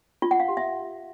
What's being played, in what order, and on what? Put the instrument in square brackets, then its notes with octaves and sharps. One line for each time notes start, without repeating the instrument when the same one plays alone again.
[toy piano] F4
F#5
F5
G4
E5